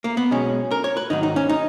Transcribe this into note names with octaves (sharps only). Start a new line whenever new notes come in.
A#3
B3
B1 B2 G#3 C#4
A#4
C#5
B4
G#2 D#3 F#3 D#4
D#4
C#4
D#4